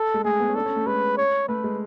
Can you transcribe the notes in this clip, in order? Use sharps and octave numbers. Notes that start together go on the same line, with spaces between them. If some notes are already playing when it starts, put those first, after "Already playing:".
Already playing: A4
G#3
A3 G#4
B3
C#4
D4 A4
C#4
A3
G#3 B4
C#5
A3 B4
G#3